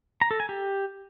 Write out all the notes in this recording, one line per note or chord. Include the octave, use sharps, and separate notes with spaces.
A#5
A4
G#5
G4